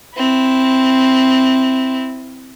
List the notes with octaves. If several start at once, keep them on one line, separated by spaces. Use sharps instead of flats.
C4 E4